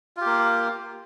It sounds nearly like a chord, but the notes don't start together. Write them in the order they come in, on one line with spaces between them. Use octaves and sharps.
F4 G4 A#3